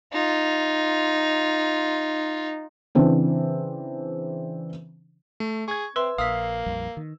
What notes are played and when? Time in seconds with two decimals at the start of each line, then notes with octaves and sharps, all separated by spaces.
0.13 D#4 F4
2.95 C#3 E3 C4 D4
5.40 A3
5.68 G#4 C#6 G#6
5.96 C4 B4 E5 C6 E6
6.18 A#1 A#3 F5 D#6 E6 B6
6.66 A#1 F2 G3
6.97 D#3